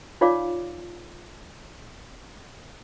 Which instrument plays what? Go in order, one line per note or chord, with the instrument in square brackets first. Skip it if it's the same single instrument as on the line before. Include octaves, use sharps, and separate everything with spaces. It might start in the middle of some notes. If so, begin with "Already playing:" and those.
[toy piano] D#4 F4 C#5 D5 F5 D6